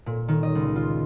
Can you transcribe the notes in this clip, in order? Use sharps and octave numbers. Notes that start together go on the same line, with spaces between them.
A#2
D#3
D#5
C#2
F4